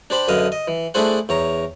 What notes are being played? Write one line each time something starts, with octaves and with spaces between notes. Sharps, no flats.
D4 G4 C5 B5
F#2 D3 B4 D#5 F5
D#5
E3
A3 D4 E4 G#4 C5 F#5
E2 C#5 A#5